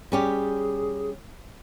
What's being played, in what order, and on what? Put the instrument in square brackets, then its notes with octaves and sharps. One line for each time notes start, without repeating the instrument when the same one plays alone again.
[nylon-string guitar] G3 C#4 G4 [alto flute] G#4